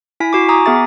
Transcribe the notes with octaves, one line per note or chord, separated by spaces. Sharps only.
E4 G#5 B6
F#4 D6
G#5 A#5 D6 D#6
B3 G#4 E5 A6